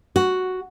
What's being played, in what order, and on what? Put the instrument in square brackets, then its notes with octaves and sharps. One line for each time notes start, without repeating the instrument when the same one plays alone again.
[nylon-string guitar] F#4